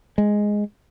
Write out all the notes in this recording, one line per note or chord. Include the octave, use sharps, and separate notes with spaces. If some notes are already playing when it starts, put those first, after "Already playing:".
G#3